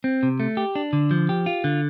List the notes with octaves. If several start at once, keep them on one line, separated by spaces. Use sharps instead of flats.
C4
C3
A3
G4
D4
D3
F3
G4
F4
D3